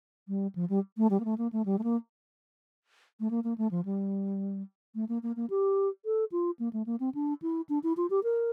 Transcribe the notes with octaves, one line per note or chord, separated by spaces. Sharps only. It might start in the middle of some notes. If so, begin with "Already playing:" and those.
G3
F3
G3
A3
G3
A#3
A3
A#3
A3
G3
A3
A#3
A3
A#3
A#3
A3
F3
G3
A3
A#3
A#3
A#3
G4
A4
F4
A#3
A3
A#3
C4
D4
E4
D4
E4
F4
G4
A#4